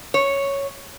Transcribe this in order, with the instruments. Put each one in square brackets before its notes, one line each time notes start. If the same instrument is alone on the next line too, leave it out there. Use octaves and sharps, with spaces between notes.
[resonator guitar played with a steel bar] C#5